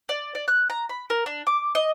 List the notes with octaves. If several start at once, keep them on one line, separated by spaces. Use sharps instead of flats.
D5
D5
F#6
A#5
B5
A#4
D4
D6
D#5